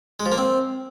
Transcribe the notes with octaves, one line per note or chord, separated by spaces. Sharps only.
G#3
F3
A#3
C4